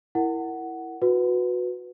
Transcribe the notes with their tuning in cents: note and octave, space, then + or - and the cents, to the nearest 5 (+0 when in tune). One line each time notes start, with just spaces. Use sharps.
E4 +0 A#4 -10 F#5 +10
F#4 -20 B4 +0